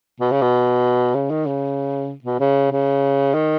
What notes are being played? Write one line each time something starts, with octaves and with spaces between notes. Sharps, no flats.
B2
C#3
B2
C#3
D#3
C#3
B2
C#3
C#3
D#3